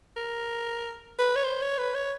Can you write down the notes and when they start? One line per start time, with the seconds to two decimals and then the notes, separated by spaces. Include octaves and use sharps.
0.16 A#4
1.19 B4
1.36 C#5
1.44 C5
1.62 C#5
1.78 B4
1.95 C#5